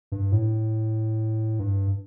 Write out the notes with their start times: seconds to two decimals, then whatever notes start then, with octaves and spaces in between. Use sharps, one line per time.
0.12 G2
0.32 A2
1.59 G2